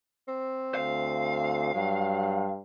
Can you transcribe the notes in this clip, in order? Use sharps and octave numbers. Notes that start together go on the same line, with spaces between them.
C4
D2 F5
G2 F#3